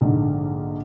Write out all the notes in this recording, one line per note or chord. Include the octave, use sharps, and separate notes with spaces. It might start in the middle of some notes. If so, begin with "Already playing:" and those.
A#1 G#2 D3